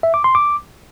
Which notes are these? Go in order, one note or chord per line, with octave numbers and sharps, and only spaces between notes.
E5
D6
C6
D6